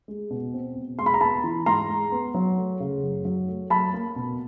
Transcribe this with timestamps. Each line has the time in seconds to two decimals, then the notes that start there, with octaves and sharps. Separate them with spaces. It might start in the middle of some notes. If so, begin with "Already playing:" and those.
0.08 G#3
0.30 B2
0.53 C4
0.76 B2
0.99 G#3 C6
1.06 B5
1.14 A#5
1.21 B3 A5 B5
1.44 E3
1.66 G#2 A#5 C6
1.89 G#3
2.12 B3
2.34 F#3
2.57 A3
2.80 C#3
3.03 F#2
3.25 F#3
3.48 A3
3.70 F#3 A5 B5
3.93 A#3
4.16 B2